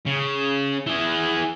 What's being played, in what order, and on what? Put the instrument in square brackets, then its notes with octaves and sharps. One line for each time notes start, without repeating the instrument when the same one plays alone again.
[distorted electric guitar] C#3
E3 G#4